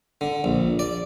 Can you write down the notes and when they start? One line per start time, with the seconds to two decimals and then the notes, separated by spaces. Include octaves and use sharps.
0.21 D3
0.44 A#1
0.79 D5